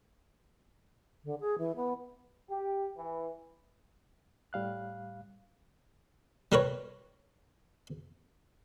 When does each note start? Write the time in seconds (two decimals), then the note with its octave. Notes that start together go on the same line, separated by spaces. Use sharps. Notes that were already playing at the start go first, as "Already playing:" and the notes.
1.24 D3
1.40 G#4
1.58 E3
1.76 B3
2.51 G4
2.97 E3
4.53 A2 G3 F5 F#6
6.52 G3 A#4 B4 C#5